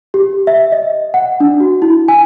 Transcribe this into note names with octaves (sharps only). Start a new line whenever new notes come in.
G4
E5
D#5
F#5
D4
F#4
E4
G#5